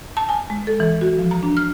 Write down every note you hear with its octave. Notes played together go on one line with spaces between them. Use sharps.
A5
G#5
G#3
A4
E3
F#4
F3
A#5
D4
F6